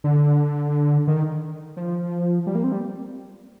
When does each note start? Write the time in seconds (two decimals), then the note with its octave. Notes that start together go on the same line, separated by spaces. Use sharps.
0.04 D3
1.07 D#3
1.77 F3
2.47 G3
2.55 A#3
2.64 C4
2.72 G3